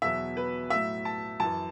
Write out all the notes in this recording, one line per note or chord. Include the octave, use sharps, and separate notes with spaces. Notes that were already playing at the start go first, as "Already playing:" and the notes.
E2 B2 F#3 E5
B4
A2 F#3 E5
A5
F#2 E3 A5